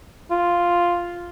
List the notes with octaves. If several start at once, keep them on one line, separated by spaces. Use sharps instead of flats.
F4